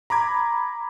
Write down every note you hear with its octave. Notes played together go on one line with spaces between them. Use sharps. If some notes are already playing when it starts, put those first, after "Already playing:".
A#5 B5 D6 G#6